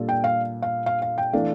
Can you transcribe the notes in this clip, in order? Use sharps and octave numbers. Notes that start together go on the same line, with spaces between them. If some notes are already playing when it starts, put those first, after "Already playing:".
Already playing: A#2 G3 D4 F4 A4
G5
F5
F5
F5
F5
G5
E3 A3 D4 F5